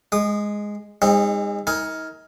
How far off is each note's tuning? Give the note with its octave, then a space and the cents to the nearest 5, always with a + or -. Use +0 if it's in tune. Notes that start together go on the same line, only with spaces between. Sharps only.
G#3 +0 D#6 -30
G#3 -35 C4 +30 D#4 -5
D#4 +35 A#4 +0 G#5 +0